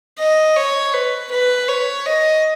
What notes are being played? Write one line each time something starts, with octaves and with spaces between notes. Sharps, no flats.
D#5
C#5
B4
B4
C#5
D#5